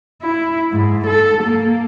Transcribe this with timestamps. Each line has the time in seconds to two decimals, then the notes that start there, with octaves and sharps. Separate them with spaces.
0.22 E4
0.72 G#2
1.06 A4
1.43 A#3